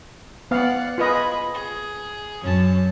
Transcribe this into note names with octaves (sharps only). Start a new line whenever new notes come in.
B3 D5 F5 F#5
F4 G#4 B4 D#5 B5
G#4
F#2 C#4 A5